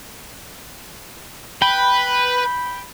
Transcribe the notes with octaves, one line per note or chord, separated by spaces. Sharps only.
B4 G5 B5